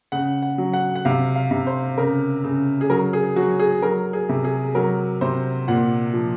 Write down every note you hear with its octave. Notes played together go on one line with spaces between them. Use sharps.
C#3 F#5
F#5
F#3
F#5
F#5
C3 F5
F5
C3
C5
C#3 A#4
C#3
G#4
F#3 A#4
G#4
F#3 F#4
G#4
F#3 A#4
G#4
C3
G#4
F#3 A#4
C3 C5
A#2 F#5
F3